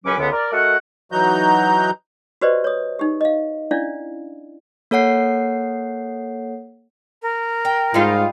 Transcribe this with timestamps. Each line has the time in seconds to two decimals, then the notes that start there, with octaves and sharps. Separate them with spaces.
0.05 C#2 F#2 F#3 C#4 B4 D6
0.19 C#2 D3 B3
0.32 A#4 D5
0.52 A3 F#4 A#4 D#5 F#5
1.12 E3 F#3 D#4 F#4 A#5 G6
2.41 F#4 G4 B4 C5 D5 D#5
2.64 C#5 D#6
2.99 D#4 G4
3.21 D#5 F5
3.71 C#4 D4 E4 D5 F5
4.91 A#3 A4 C#5 F#5 C7
7.22 A#4
7.65 G5
7.94 G#2 G3 D#4 F4